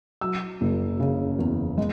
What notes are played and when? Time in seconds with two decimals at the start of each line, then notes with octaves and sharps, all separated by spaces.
0.21 F#3 E6
0.61 F#1
1.00 C#3
1.39 E2
1.78 G#3